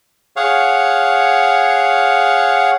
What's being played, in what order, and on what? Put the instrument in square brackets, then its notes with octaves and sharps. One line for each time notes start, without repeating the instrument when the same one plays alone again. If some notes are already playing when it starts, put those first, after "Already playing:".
[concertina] G#4 C#5 F5 F#5